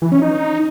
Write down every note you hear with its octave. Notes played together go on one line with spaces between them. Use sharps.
E3
C#4
D#4